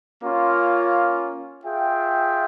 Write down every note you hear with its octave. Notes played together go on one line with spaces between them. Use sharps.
A#3 C#4 F4
F4 G#4 E5 G5